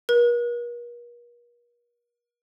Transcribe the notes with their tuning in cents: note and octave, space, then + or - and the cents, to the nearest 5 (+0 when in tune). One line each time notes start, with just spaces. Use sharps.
A#4 +45